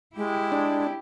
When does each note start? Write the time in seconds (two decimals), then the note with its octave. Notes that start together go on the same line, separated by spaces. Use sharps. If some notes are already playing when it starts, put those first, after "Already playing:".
0.16 G#3 E4 G4
0.52 D4